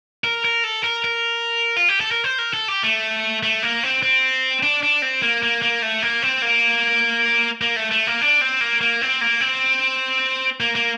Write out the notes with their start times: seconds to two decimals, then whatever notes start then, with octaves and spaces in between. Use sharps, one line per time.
0.24 A#4
0.45 A#4
0.64 A4
0.84 A#4
1.04 A#4
1.77 F4
1.89 G4
2.01 A4
2.11 A#4
2.24 C5
2.39 A#4
2.54 A4
2.68 G4
2.83 A3
3.43 A3
3.63 A#3
3.83 C4
4.03 C4
4.63 D4
4.83 D4
5.02 C4
5.22 A#3
5.43 A#3
5.62 A#3
5.82 A3
6.02 A#3
6.22 C4
6.42 A#3
7.62 A#3
7.76 A3
7.91 A3
8.07 A#3
8.21 D4
8.41 C4
8.61 A#3
8.81 A#3
9.01 C4
9.21 A#3
9.41 C4
10.60 A#3
10.75 A#3